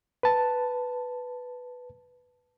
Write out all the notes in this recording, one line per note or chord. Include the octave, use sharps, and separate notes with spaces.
B4 A5